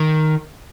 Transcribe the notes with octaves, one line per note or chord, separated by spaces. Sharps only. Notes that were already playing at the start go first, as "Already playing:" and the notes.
Already playing: D#3